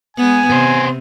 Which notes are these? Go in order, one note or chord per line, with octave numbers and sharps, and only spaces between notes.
G#3 B3 G#5
C3 B3 C5